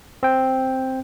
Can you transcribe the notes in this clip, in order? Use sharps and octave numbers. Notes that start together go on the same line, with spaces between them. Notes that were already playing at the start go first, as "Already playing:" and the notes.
C4 G5